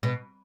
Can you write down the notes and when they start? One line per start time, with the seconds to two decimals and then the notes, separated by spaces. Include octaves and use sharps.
0.03 B2